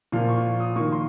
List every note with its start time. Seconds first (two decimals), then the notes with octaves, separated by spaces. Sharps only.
0.12 A#2 F3 A#3 F5
0.29 C#6
0.60 D#6
0.76 D#3 A#3 C#6
0.92 C6